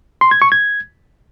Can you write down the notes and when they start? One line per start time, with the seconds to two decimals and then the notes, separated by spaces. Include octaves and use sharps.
0.21 C6
0.31 G#6
0.42 C#6
0.52 G#6